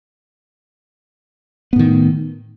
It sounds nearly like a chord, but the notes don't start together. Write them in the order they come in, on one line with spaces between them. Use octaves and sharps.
B3 A2 D#3